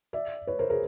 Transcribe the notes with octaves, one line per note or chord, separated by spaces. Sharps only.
D5 E5
B4 C#5
A#4 C5
G#4 A#4